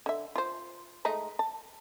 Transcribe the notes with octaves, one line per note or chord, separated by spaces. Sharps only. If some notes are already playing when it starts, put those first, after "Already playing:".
D3 E5
F4 C5
G#3 A3 D#4
A5